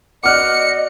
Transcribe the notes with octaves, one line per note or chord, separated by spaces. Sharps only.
B3 F#4 D5 D#5 D6 F6 F#6 C#7